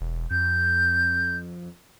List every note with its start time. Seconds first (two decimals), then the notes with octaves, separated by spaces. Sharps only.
0.01 E1
0.31 F2 G6